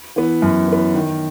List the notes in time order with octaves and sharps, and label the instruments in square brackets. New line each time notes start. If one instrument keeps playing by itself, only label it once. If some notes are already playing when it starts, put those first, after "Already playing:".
[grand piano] E3 B3
F#2
E3 B3
D#3